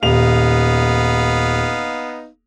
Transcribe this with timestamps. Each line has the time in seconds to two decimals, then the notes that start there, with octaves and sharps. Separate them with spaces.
0.03 D#1 B3 D#4 F5 F7